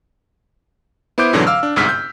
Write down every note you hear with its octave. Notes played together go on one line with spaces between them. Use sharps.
B3 E4 C5 D6 G6 D7
F2 G#2 B2 D3 E3 F#3
F5 D6 E6 F6
D4
G1 C2 G#2 E6 F6 B6
G6